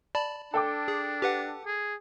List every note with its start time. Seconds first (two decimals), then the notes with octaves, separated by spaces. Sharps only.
0.15 D5 A5 B5
0.54 D4 A4 G5 D6
0.88 G#4
1.22 G4 B4 F#5
1.66 G#4